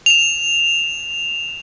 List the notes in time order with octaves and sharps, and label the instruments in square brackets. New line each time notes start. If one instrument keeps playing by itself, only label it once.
[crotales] E7 F7